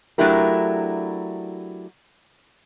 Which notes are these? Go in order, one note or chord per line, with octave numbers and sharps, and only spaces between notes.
F#3 A3 D4 E4 G4 A#4